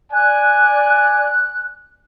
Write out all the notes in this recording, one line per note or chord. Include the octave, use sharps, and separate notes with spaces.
D5 G#5 F#6